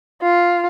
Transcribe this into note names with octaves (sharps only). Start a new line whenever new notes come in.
F4